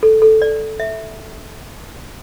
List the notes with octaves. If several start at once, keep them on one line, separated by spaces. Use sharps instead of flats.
A4
A4
D5
E5